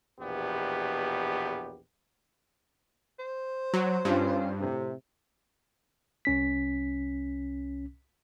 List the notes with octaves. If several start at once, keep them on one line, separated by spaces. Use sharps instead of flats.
A#1 E2 B2 B3 G4
C5
F#3
G2 C#4 F4
A2 C3
C2 C#4 B6